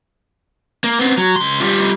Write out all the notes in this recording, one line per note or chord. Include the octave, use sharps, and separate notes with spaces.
A#3
B3 C4
F#3
C#2 C6
G3 F4